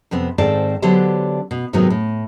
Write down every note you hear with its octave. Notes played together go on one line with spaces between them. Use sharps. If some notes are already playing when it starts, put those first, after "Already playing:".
F2 C3 B3 C4
G#2 D#3 C4 A4 D5 A5
D3 F#3 B3 D4 G4 C5
B2
G#2 C3 D#3 F#3 B3 D#4
A2